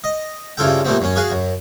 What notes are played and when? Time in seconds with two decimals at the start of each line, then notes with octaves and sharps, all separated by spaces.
0.04 D#5
0.57 G2 C#3 E4 F4 A4 G5
0.85 A#2 G3 A3 B3 C4
1.01 F#2 C#4
1.16 F#4 G#4 B4 F5 G#5
1.31 F#2